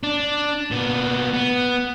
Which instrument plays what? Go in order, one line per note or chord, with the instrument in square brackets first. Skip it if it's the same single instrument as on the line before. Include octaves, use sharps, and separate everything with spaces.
[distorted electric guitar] D4
A#2 B3
B3